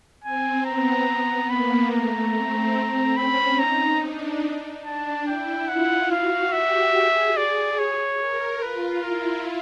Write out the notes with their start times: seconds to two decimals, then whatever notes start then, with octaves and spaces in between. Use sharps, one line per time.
0.23 C4 G#5
0.65 B3 A#5
1.49 A#3 B5
1.91 A3 A#5
2.33 C4
3.16 C#4 B5
3.59 D#4 A#5
4.01 D4
4.85 D4 A5
5.27 E4 G5
5.68 F4 F#5
6.10 F#4 F5
6.52 G4 E5
6.94 G#4
7.36 G#4 D5
7.78 C#5
8.20 A#4
8.62 F4 B4
9.04 E4 A#4